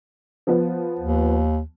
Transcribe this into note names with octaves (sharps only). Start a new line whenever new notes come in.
F3 B3
D#2